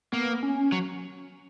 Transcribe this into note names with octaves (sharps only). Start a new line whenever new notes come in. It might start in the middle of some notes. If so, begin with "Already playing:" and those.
A#3 B3
C#4
F#3